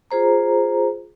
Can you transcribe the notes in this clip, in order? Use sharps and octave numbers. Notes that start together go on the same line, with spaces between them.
F4 G#4 C5 A#5